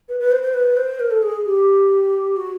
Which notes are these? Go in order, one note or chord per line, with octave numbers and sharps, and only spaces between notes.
B4
B4
C5
C5
B4
C5
A#4
A4
G#4
G4
F#4